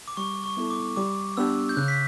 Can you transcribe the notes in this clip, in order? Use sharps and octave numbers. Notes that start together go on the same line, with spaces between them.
D6
G3 C#6
C#6
B3 E4 A4
D6
G3 D6
B3 D4 G4 E6
G6
C#3 F#6
B6